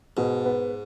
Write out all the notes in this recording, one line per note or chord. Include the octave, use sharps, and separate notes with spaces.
G#2 B2
B3